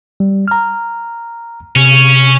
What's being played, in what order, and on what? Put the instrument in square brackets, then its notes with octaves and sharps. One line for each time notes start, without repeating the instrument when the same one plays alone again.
[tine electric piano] G3
A#5 F6
[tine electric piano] C3 [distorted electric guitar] C#4